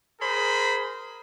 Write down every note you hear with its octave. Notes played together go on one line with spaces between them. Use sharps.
G#4 A#4 C5 B5